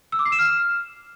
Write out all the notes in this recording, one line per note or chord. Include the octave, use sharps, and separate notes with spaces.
E6
D6
C7
E7
F6